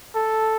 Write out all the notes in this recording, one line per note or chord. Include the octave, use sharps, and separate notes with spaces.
A4